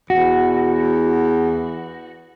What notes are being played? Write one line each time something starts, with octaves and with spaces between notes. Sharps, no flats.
E2 F#4